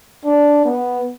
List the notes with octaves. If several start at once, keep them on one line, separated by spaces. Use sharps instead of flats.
D4
B3